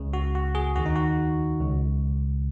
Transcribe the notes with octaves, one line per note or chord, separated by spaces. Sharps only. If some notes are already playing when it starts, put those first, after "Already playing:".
Already playing: C#2 C#3
F#4
F#4
G#4
D#2 D#3 F#4
D#4
F#4
C#2 C#3